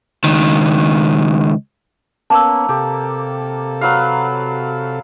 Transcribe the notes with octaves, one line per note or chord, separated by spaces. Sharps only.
C#2 D#3
A#3 B3 C#4 A5 E6
C3 G4 A4
F#3 B4 F5